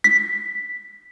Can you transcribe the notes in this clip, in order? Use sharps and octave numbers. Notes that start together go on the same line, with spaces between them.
B6